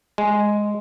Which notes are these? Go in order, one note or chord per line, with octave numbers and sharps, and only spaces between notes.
G#3